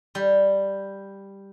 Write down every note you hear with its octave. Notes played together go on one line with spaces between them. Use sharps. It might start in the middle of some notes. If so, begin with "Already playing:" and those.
G3